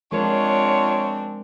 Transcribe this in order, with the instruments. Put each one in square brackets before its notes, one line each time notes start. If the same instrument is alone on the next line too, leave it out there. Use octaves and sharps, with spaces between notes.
[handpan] F3 G#3 A#4 [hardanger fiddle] C4 D4 [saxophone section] F4 C#5